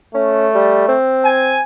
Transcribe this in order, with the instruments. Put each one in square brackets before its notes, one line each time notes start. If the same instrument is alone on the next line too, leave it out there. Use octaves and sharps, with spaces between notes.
[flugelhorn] A3 [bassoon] C#4
[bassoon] G3
C4
[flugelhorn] G#5